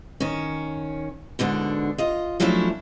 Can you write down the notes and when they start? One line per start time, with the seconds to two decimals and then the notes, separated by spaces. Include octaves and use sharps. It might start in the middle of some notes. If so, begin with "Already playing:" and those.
0.20 D#3 C#4
1.39 G#2 B2 D3 D4
1.98 F4 D#5
2.40 F3 F#3 A3 C#4 D4 E4